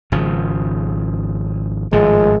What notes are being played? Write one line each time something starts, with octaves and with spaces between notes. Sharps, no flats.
G#1 C#3 F3
G#1 A2 F3 G#3